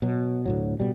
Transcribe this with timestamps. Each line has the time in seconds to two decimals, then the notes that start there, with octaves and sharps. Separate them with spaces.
0.02 B2 F#3
0.46 D2 A2 F#3
0.80 B2 G3